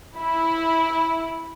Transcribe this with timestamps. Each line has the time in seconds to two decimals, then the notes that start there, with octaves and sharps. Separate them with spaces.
0.16 E4